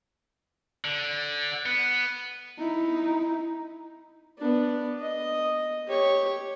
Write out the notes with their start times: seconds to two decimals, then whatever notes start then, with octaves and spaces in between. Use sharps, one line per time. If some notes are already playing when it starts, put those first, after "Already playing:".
0.85 D3
1.66 B3
2.59 D#4 E4
4.38 B3 D4
5.02 D#5
5.87 G4 C#5